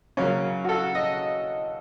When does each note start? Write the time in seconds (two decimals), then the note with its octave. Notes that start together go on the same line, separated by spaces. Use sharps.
0.17 C#3 F#3 A#3 C#4
0.64 F#4
0.69 A4
0.95 D#5